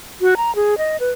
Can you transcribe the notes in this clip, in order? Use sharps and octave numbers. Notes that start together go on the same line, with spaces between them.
F#4
A#5
G#4
D#5
B4